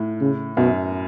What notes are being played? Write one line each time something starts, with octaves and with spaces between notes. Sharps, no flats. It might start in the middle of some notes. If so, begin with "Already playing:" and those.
Already playing: A2
C#3
F#2 B2